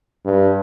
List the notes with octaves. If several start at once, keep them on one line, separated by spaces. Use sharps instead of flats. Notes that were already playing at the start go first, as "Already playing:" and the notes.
G2